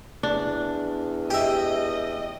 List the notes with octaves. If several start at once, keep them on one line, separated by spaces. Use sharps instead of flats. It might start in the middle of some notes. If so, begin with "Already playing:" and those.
E2 D4
G4 D#5 E5